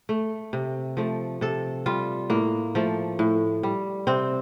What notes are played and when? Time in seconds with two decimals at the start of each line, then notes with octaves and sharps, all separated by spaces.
0.09 A3
0.53 C3
0.97 F3 A3
1.41 C3 A4
1.86 G3 F4
2.30 A2 A#3
2.75 F3 A3
3.19 A2
3.63 G3
4.07 C3 C4